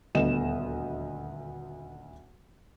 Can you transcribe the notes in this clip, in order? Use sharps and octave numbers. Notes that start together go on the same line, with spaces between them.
D#1 D2 B3 D#5 E7